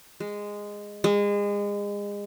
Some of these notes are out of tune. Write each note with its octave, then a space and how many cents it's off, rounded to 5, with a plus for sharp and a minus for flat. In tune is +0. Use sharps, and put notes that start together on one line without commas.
G#3 -10
G#3 -30